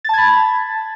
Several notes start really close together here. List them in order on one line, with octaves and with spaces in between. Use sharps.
A6 A5 G#6 B5